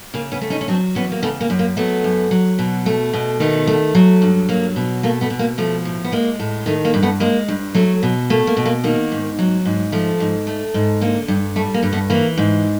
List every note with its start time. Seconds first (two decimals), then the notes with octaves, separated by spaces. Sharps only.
0.14 C#3 A#3
0.32 B3 C#4
0.41 A3
0.50 C#4 D#4
0.61 C#4
0.68 F#3 C4 D4
0.95 E2 B3 C#4
1.12 A#3
1.22 C#3 A3 B3
1.41 A#3
1.50 F#2
1.59 A#3
1.77 F#3 A3 B3
2.04 F#2
2.31 F#3
2.59 B2
2.86 A3
3.13 B2
3.40 D#3 A3 B3
3.67 A3
3.95 F#3
4.22 G2
4.49 F#3 A#3
4.76 B2
5.03 A3 A#3
5.21 A3 B3
5.30 B2
5.39 A#3
5.58 F3 A3
5.85 A2
6.04 B3
6.12 G#3 A#3
6.39 A2
6.66 D#3 A3
6.85 A#3
6.94 G2
7.03 A3 B3
7.20 G#3 A#3
7.48 G2
7.74 F#3 A3
8.03 B2
8.30 A3 A#3
8.47 A#3
8.57 B2
8.65 A#3
8.84 D#3 A#3
9.12 G#2
9.39 F#3
9.65 G#2
9.92 F3 A3
10.20 G#2
10.47 A3
10.74 G#2
11.01 D3 A#3
11.28 G2
11.56 G3 A3
11.74 A#3
11.83 G2
11.93 A3 B3
12.10 E3 A#3
12.38 G#2